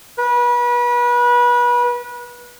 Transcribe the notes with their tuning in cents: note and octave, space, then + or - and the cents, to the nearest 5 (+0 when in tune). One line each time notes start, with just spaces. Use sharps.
B4 -30